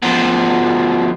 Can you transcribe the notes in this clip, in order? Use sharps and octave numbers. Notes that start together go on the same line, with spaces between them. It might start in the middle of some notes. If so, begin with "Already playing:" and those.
B2 F3